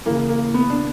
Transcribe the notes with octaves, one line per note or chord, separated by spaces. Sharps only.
C#3 E3 A#3
A#3
B3
D4